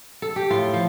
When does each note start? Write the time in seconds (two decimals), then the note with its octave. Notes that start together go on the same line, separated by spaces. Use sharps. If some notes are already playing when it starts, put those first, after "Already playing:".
0.22 A4
0.36 G4
0.51 A2 F4
0.74 F3